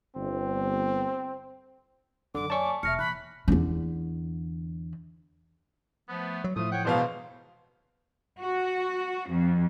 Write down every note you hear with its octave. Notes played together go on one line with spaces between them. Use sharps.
G1 C4
F#2 D3 F#3 D6
C#5 D5 G#5 A5 C#6
E1 E5 F6 A#6 C#7
A#2 E3 B5 F#6
E2 D3
F3 A3 B3
F#3
A2 F3 A3 F4 D#6
C#5 F#5 G5
E1 B2 G#3 B3 C5 F5
F#4
F2